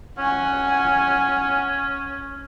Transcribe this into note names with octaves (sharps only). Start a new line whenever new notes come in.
C#4 F#5 G#5